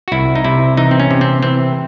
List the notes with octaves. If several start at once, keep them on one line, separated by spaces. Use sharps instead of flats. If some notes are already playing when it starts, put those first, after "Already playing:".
F#4
C2 E4
D#4
C3 E4
E3 D#4
C4
C#4
C3
C4
E3 C4